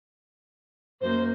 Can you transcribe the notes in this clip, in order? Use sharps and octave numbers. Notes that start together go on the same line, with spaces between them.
F#2 A#3 C5